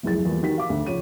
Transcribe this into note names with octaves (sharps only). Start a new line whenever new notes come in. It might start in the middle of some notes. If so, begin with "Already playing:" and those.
F1 C#2 F#2 E4 G#4 A6
E2 F3 G3 A#3
D#3 F#4 G4 B6
F5 D6
D2
C#3 F3 C#5 D#7